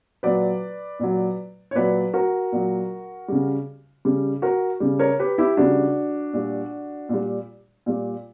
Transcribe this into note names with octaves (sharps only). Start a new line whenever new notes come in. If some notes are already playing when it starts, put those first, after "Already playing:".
A#2 F#3 B4 D5
A#2 F#3
C#5
A#2 F#3 B4 D5
F#4 A#4
A#2 F#3
C#3 G3
C#3 G3
F#4 A#4
C#3 G3
A#4 C#5
G4 B4
E4 G4
C#3 G3 D4 F#4
A#2 G3
A#2 G3
A#2 G3